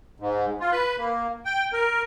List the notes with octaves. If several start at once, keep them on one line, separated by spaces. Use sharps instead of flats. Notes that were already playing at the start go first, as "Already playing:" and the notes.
G#2
F4
B4
A#3
G5
A#4